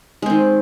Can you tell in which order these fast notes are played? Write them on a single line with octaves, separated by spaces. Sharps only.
G#3 C4 D#3